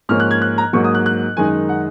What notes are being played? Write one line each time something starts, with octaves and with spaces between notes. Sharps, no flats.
G#2 F3 A#3 C#4 F6
F#6
G#6
F#6
A#5
G#2 F#3 A#3 C#6
D#6
F#6
F#6
F#2 D#3 G#3 D#4 G#5
F#5